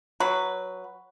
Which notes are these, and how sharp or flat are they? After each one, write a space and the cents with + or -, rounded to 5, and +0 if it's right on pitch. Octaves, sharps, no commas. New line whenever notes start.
F#3 +0 B4 +0